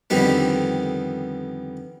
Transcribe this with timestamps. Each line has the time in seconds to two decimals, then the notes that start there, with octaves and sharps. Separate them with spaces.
0.10 F2 D3 D#3 G3 B3